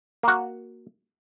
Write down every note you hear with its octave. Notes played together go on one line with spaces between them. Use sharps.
A#3 F#4